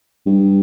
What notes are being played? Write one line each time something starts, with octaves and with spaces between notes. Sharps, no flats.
G2